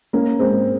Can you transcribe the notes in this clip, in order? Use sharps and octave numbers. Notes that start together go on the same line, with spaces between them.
A#3 C#4
G#3 C4